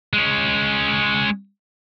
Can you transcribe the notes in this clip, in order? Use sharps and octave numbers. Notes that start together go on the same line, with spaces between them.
G#3 C#4